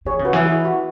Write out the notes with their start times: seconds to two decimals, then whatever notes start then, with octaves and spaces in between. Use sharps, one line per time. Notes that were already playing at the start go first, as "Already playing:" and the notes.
0.05 E3 G#4 C#5
0.19 C#3
0.25 F#4 B4
0.33 E3
0.45 E4 G#4
0.65 F#4